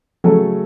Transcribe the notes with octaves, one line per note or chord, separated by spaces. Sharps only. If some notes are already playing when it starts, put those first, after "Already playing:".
C#3 F#3 A3 C#4 A4